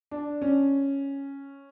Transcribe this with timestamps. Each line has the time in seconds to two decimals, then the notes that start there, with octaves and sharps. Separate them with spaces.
0.11 D4
0.42 C#4